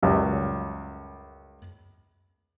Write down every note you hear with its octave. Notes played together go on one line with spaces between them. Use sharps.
C#2 F#2 G3